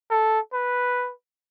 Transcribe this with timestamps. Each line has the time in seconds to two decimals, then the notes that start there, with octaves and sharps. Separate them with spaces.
0.10 A4
0.53 B4